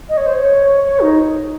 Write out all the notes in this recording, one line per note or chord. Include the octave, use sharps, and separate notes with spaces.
D#5
C#5
C5
C#5
C#5
D#4